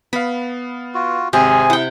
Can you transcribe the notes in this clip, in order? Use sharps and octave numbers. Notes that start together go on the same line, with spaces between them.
B3 F5 B5
F4 F#4
G#1 C3 C4 G#4 G#5 G6
E4 F#5 G5